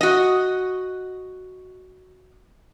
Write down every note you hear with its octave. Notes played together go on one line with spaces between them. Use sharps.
F#4 D#5